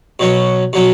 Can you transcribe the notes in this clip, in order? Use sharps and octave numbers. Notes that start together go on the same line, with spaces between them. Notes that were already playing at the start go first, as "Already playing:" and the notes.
B2 F#3 C#4
B2 F#3 C#4